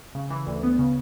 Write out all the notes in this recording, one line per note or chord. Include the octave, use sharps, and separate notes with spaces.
C#3
E3
D2
B3
C#3